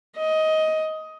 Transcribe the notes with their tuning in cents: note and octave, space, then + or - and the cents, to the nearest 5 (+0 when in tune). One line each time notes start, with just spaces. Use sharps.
D#5 +15